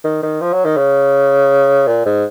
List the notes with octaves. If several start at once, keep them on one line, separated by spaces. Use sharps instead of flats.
D#3
D#3
F3
F#3
D#3
C#3
A#2
G#2